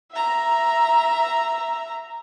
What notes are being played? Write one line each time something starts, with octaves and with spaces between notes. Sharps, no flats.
E5 A#5